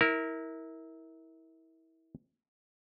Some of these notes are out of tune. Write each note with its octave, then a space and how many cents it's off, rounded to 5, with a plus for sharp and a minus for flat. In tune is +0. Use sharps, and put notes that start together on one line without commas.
E4 -25 A#4 +0